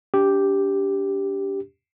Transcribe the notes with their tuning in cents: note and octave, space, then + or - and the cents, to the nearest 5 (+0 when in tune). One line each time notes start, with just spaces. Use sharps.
D4 -40 G4 +0